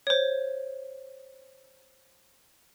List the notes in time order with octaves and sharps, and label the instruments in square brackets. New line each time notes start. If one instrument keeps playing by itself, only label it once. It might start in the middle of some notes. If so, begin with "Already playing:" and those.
[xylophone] C5 C#5